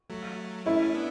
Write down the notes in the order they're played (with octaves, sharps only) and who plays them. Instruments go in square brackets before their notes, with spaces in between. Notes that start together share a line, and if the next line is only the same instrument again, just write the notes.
[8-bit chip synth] F#3 A3
[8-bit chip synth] A3 C#4 [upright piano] E4
[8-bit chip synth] B3 D4